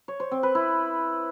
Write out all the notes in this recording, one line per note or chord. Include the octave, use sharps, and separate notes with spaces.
C#5
C5
C4
B4
E4